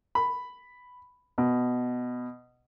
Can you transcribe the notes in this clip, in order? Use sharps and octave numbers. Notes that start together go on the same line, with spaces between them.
B5
B2